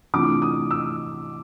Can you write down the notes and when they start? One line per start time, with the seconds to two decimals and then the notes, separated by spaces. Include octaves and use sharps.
0.13 C3 E3 A3 D4 F4 D6
0.42 D#6
0.71 E6